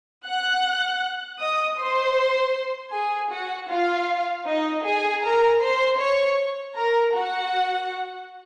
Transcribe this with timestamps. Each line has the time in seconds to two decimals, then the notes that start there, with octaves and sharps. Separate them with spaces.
0.26 F#5 F#6
1.40 D#5 D#6
1.79 C5 C6
2.94 G#4 G#5
3.32 F#4 F#5
3.70 F4 F5
4.46 D#4 D#5
4.84 G#4 G#5
5.23 A#4 A#5
5.61 C5 C6
5.99 C#5 C#6
6.76 A#4 A#5
7.14 F#4 F#5